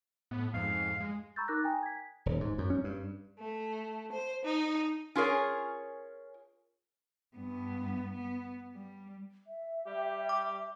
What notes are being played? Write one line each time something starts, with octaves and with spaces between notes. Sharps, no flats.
A2 B3
F2 G#2 F5
G#3
A#5 B5 C#6 E6 G6 A6
D#4 A#4 D6 F#6 A#6
G5 G#5 A#5 D#6
G#6 B6
D#1
G#2
F#2
C#4
G2
A3
C5
D#4
C#4 F4 G#4 A#4 C#5
G2 B3
B3
G3
E5
G3 G4
D6